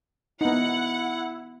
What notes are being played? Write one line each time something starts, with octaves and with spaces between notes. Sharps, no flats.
B3 D#4 E4 F#5